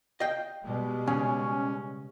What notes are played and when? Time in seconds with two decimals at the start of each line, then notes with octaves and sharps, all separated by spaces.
0.20 D#5 F5 G5
0.65 B2 G3 G#3
1.07 C#3 C#4